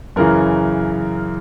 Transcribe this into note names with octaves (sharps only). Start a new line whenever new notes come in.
F#2 C#3 E3 A#4